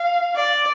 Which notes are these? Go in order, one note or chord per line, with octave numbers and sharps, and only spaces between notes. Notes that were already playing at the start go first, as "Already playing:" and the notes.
Already playing: F5
D5